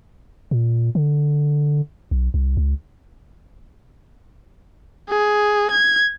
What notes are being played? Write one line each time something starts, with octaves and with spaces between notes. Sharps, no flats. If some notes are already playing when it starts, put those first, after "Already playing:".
A#2
D3
B1
C2
C#2
G#4
G#6